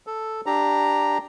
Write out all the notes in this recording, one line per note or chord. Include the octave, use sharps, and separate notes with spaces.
A4
D4 G4 A#5